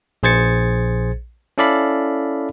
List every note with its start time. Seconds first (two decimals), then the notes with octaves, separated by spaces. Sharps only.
0.23 A#1 G#4 C5 G#6 A6 C#7
1.58 C#4 E4 A4 D5 F5 B5